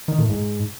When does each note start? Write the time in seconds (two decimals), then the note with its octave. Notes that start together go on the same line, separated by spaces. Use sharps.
0.08 D#3
0.18 A2
0.29 G#2